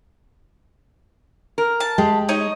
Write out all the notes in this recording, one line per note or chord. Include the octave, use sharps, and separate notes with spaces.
A#4
A5
G#3 G4
D#4 C#5 D#5